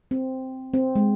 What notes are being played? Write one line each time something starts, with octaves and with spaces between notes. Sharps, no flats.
C4
C4
G#3